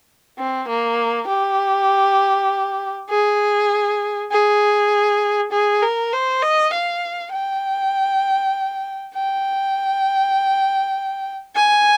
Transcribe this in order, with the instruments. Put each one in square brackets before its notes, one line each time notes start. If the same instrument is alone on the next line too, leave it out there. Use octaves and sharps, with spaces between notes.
[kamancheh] C4
A#3
G4
G#4
G#4
G#4
A#4
C5
D#5
F5
G5
G5
G#5